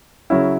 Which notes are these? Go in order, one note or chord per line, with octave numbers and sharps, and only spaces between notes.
C#3 F#3 C#4 E4